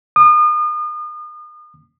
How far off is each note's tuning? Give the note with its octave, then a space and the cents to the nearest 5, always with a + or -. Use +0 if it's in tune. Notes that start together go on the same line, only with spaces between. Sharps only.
D#6 -40